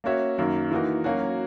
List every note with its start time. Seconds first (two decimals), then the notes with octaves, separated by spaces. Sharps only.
0.04 A#3 C#4 F#4 C#5 E5
0.38 F#2 D#3 A#3
0.72 E3 A#3 D#4 F#4
1.04 F#3 A#3 C#4 F#4